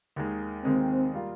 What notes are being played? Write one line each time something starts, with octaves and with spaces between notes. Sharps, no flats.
D#2 D#3 G#3
D#2 D#3 G#3 C4
G3 A#3 F4